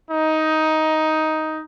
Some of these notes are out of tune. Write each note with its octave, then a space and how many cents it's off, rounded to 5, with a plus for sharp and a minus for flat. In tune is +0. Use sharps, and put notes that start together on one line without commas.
D#4 +10